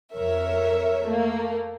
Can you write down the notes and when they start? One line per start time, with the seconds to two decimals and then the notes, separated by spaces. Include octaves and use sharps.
0.15 F2 A#4 C#5 E5
1.05 A3 A#3